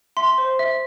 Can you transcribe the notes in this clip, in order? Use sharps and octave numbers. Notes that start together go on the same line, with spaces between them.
E5 C6
C5
E5